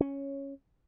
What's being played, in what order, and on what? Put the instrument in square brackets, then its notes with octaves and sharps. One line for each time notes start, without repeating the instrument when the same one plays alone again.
[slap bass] C#4